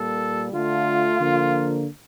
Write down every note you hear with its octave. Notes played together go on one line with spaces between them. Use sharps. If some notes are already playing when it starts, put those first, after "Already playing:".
Already playing: A#2 G3 A#3 A4
D3 A3 F4
D3 F3 A#3